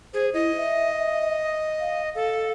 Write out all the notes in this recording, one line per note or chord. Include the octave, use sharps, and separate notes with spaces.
G#4 C5
E4 D#5
E5
F5
A4 F5